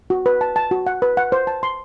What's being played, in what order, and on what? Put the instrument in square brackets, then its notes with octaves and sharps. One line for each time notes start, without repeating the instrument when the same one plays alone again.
[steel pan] F#4
B4
A5
A5
F#4
F#5
B4
F#5
C5
A5
C6